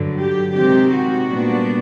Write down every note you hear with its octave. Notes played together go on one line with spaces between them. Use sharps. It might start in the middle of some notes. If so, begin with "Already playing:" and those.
Already playing: G2 D3 F#3
G4
C3 D#3 G#3 C4 G4
F#4
A#2 G3 B3 D4